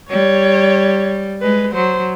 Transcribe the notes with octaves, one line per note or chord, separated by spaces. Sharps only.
G3 C#5
G#3 B4
F#3 C5